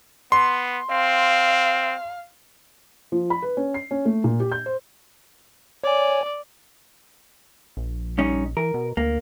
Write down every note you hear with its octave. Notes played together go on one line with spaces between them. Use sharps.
B3 C6
C4 F5
F3
B5
B4
C#4
C7
C#4
A3
A#2
G4
G6
C5
C#5 D5 G#5
A#1
G2 C#4 D#4
E3 A#4
B2
D2 A#3